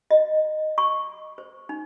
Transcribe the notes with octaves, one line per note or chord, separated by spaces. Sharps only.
D#5
C#6
C5
D#4